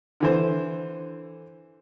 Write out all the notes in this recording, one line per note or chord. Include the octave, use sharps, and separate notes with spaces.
D3 E3 C5